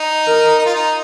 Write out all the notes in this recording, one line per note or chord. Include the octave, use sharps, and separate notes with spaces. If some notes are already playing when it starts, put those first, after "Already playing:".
Already playing: D#4
A#4
D#4
F4
D#4